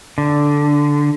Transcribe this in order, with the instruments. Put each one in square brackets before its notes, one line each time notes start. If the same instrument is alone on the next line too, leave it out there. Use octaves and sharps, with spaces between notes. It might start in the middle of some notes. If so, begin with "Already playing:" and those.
[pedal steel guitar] D3